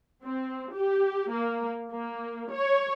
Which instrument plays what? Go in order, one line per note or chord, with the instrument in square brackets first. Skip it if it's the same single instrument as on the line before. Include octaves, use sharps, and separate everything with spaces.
[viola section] C4
G4
A#3
A#3
C#5